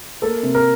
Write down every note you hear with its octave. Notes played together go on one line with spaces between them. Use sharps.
A#3 A4
C3
A#4